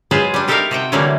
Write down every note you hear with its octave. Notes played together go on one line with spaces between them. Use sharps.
F#3 G#3 F4 G#4 B4 C5
G3 D4
D#4 G4 A4 A#4 E5 F5
C3 F#4 G5 A5
D3 E3 F#3 G3 A3 A#3